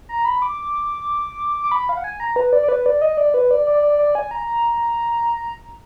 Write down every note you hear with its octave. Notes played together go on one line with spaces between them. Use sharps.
A#5
B5
D6
D6
B5
F5
F#5
G#5
A#5
B4
D5
D5
B4
D5
D#5
D5
B4
D5
D5
D5
D5
G#5
A#5